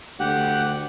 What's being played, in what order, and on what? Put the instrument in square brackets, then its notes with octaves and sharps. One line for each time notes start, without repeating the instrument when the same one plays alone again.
[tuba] D2 [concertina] G4 F#5